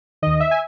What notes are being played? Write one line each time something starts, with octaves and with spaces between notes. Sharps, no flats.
D#2 D#3 D#5
E5
G#5